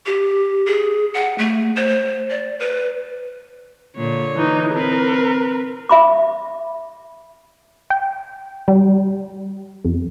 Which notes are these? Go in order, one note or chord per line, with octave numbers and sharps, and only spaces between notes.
G4
G#4
F#5
A3
C5
D5
B4
A#2 D3 C#5
E3 D#4
C4 A#4 B4
E5 B5 D6
G5
G3
F2